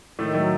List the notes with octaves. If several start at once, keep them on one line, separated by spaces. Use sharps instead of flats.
A2 D#3 A3
A2 F#3 A3